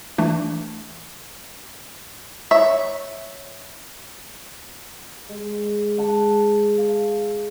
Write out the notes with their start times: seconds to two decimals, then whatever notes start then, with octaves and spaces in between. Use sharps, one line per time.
0.18 E3 A3 D4
2.51 C#5 E5
5.29 G#3
5.97 G#3 F#5 A5 D6
6.78 F5